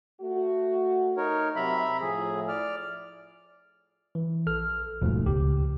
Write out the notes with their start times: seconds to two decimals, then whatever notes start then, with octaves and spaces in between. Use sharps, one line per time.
0.21 A3 F#4
1.17 D#4 A#4 C#5
1.56 C3 F#3 E5 A#5 B5
2.01 A2 F3 G#4
2.48 D5 F6
4.15 E3
4.46 A#1 A4 F6
5.02 D#1 G#2 B2 F3 A3
5.26 C#2 G4